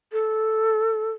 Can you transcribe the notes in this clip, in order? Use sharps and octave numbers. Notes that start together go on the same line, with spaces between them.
A4